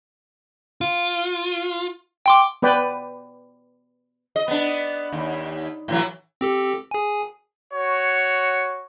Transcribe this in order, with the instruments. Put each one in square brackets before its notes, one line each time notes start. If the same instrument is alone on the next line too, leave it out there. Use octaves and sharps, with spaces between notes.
[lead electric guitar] F4
[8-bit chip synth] G5 C6 D6
[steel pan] B3 B4 D5 G5
[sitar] D#5
B3 D4
D#2
A2 E3 F#3
[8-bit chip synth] C4 G4 A4
G#4 G#5
[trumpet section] F#4 C#5